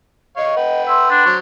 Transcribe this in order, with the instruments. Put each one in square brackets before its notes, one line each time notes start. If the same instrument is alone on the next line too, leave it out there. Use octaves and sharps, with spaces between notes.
[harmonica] C#5 F5 [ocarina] D#5
[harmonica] B4 F#5 G5
[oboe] E5 [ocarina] C6
[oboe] D4
[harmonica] F#3 C5 C#5